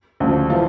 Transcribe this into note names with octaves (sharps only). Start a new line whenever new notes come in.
D2 C#3 F3
E3 F3 F4